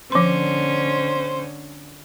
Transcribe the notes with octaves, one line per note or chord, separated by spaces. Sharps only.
D3 F3 C#4 C5 C6